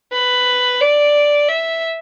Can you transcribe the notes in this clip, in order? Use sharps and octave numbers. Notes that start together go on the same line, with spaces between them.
B4
D5
E5